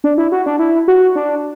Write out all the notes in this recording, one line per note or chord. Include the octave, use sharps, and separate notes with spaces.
D4
E4
F#4
D4
E4
F#4
D4